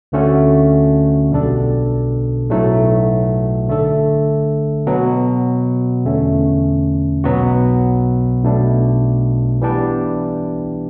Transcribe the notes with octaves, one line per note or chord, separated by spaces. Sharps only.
D2 D3 A3 C#4 F#4
B1 B2 G3 D4 A4
B1 A2 F#3 A3
D3 A3 D4 A4
B2 F#3 B3
E2 D3 A3 C#4
B1 B2 F#3 B3 F#4
B1 B2 A3 D4
E3 G3 B3 D4 G4